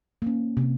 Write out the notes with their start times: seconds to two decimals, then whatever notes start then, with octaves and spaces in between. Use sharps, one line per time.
0.22 A#3 C#4
0.57 C3